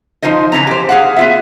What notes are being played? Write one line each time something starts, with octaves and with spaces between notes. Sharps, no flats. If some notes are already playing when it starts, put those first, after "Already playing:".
F3 D#4 F4 C5 D#5
C#3 E3 C#4 A#5
G4 C5
G#4 F5 F#5
B3 F4 E5